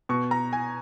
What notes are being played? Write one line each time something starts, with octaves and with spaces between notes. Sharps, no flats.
B2 C#6
A#5
G#5